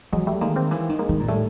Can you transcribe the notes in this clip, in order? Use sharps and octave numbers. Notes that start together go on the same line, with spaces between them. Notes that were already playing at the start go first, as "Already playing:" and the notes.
E3 F#3 G#3
G3 A3
D#3 G#3 A#3
A#3 C4
E3
D#3
G#3 A#3
D#3
A#2
A2 G3 A3